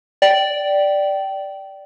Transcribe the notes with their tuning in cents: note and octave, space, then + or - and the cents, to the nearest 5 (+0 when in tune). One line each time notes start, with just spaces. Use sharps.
D5 +0 G5 -20